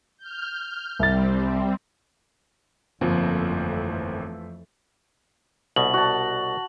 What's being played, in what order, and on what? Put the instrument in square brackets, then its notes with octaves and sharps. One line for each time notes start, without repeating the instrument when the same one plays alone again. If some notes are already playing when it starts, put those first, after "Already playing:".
[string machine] F6 G6
[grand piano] C2 A6 [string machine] G3 C4
[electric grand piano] G1 A#3 C4 [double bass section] F2 E3 A3 [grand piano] F3
[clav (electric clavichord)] C2 B2 [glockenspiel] F#7
[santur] F#4 A5